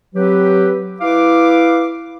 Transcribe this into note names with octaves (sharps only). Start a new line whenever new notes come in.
F#3 C4 G4 B4
E4 B4 F5 D6